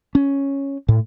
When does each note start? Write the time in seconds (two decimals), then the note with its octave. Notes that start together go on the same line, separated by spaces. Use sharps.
0.15 C#4
0.88 A2